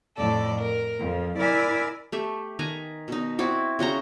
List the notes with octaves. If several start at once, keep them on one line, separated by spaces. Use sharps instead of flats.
F2 A2 A4 D5
A#4
F2 F3
E4 A#4 D5 E5 G#5
A3 G4 E5
D#3 B4 G#5 A#5
B2 D#4
C4 E4 F#4 D5
C#3 F#4 G5 A#5